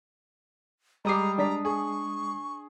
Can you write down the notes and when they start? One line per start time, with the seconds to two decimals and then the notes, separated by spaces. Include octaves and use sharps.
1.05 G3 G#3 A#5 D6 D#6 C7
1.38 D4 D5 A#5 B6
1.65 G#4 C#6